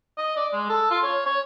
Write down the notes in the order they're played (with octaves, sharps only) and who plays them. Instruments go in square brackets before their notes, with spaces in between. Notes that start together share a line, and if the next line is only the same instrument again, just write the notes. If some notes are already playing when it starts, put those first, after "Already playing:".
[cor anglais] D#5
D5
G#3
A4
F4
C#5
C#5